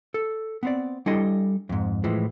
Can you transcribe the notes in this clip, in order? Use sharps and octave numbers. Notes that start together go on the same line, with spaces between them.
A4
B3 C4 D5
G3 D4 E4 A4 D#5 C6
F2 G#2
A2 E3 F3 G#3